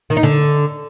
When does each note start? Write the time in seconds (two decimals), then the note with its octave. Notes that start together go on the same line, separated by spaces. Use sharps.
0.10 D#3
0.17 D#4
0.23 D3